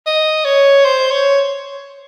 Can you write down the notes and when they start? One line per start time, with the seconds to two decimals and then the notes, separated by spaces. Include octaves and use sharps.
0.06 D#5
0.45 C#5
0.85 C5
1.11 C#5